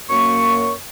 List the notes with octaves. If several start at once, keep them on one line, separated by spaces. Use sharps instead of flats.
F#2 A#3 C#6